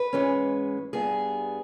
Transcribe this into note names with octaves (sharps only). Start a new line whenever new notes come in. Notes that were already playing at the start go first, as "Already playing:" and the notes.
Already playing: B4
G#2 E3 G#3 C#4
G2 G3 B3 G#4